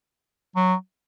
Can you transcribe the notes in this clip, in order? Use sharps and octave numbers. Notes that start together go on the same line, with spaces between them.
F#3